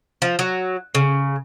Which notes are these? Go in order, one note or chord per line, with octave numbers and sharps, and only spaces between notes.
F3
F#3
C#3